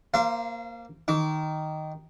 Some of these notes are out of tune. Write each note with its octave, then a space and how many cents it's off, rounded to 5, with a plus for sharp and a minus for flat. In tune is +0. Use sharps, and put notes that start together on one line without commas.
A#3 +0 C5 +0 F5 -35
D#3 +0 D6 -35